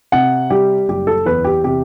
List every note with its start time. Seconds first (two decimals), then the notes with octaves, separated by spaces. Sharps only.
0.12 C3 F#5
0.50 G3 G4
0.88 F#1 G4
1.07 A4
1.26 E2 B4
1.45 G4
1.64 C3 G4